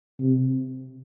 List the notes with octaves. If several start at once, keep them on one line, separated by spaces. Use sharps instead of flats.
C3